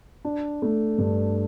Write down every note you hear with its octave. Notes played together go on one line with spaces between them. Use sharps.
D4
A3
G2